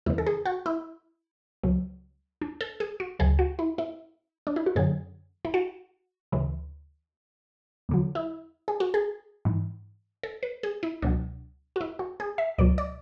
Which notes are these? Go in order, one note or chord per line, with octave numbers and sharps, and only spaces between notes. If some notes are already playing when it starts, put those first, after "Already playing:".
E2 C#3 E3 E4
A4
G#4
F#4
E4
C#2 C#3 F#3
D4
A4
G#4
F#4
D2 C#3 F#3 G#4
F#4
E4
E4
D4
E4
F#4
F#2 D3 F#3 G#4
E4
F#4
D2 C#3 E3
E2 D3 F#3
E4
G#4
F#4
G#4
G#2 E3
A4
B4
G#4
E4
C#2 B2 F#3 D4
F#4
E4
F#4
G#4
E5
C#2 B2 F#3 D5
D5